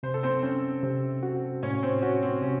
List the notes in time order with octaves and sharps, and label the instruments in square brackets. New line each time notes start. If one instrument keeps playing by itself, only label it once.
[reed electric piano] C3 [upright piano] C5
[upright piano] A4
C4 C5
[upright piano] C4 C5 [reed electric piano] C#4
[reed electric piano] C3
F#4
[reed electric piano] A2 [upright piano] C#4 C#5
[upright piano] C4 C5
[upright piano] C#4 [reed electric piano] F#4
[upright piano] C4
[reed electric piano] C3 [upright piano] C#4